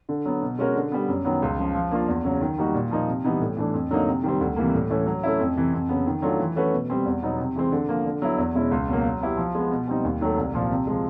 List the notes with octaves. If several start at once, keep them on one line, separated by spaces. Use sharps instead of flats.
D3
F#3 B3
B2
G#3 C#4 F#4 A#4
D3
G3 B3
F#2
D#3 F#3 B3
C#2
C#3 F3
F3
A#3 D4 F4
E2
C#3 F#3
D#3
G3 A#3 D#4 F#4
A#2
F3 A#3 D#4
C3
E3 G3 B3 D#4
A2
E3 A3 D4
F2
D3 F#3 A#3 D#4
C3
D#3 G3 C4
D2
C3 E3 G3 A#3
A2
E3 A3 C#4
F#3
A3 C#4 E4
F2
C3 E3
F2
C#3 F#3 B3
D#3
F#3 A3 D4 F4
E3
A3 C#4 F#4 B4
B2
G3 C4
E2
B2 F#3 B3 D#4
C3
E3 G#3 C4
D3
F3 A#3
D3
F#3 B3 E4
E2
B2 G#3 C#4 E4
C#2
B2 F#3 A#3
F#3
B3 E4 G4
F3
G#3 B3
B2
G3 C4 D#4
D#2
D#3 F#3 A3
C2
A#2 F3
C3
F3 G#3